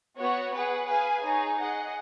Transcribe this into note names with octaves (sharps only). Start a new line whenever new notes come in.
B3 F#4 C#5 F#5
G#4 B4 F#5
G#4 B4 F5 G#5
D#4 G#4 C#5
G#4 D#5 F#5